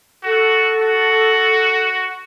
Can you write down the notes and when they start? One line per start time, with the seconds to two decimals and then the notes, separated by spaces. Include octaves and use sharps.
0.24 F#4 A4
0.82 F#4